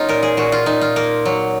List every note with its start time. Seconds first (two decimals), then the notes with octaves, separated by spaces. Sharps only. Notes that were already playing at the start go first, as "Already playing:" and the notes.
Already playing: F#3 A#3 C#4 D#4 F4
0.09 A#2 A#4
0.23 G#4
0.37 A#2 F#4
0.52 F4
0.66 A#2 D#4
0.81 F4
0.96 A#3 A#4
1.25 F#3